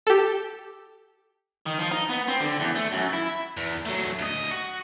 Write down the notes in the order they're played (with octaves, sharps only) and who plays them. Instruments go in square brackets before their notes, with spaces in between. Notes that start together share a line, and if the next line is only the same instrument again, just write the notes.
[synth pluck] G4 A4
[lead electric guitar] D#3
F3
D#4
B3
C4
D3
E2
A3
F#2
E4
[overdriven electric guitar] E2
F#3 A3
D2 D#5
F#4